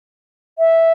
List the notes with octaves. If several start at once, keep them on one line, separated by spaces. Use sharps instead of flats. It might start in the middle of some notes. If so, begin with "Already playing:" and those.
E5